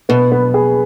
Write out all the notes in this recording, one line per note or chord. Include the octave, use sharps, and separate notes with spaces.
B2 B3
B3
G#4